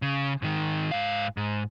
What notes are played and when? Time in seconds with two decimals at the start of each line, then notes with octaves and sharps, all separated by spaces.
0.02 C#3
0.42 G#2 D#3
0.91 G#2 F5
1.37 G#2